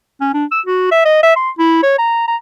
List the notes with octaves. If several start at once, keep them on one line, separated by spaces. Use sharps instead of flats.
C#4
D4
E6
F#4
E5
D#5
E5
C6
E4
C#5
A#5
A#5